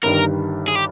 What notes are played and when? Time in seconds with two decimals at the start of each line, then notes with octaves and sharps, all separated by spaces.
0.03 G1 G2 D#3 G3 A#4
0.68 G#4
0.75 G4